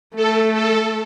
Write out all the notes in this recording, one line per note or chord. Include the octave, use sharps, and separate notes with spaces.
A3 A4
A4